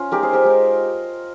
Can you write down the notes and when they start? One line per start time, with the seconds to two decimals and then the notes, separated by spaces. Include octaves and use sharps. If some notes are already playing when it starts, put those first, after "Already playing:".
Already playing: C#4 F4
0.12 G#3 D#4 G4 A#4
0.23 G#4 C5
0.33 G4 A#4
0.44 G#3 D#4 G4